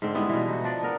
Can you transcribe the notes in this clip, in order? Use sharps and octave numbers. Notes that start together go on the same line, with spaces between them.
G#2 D3 C4
G3 G#3 B3 E4
B2 E3
D#4 F#4
F3 D4 D5
B3 A#4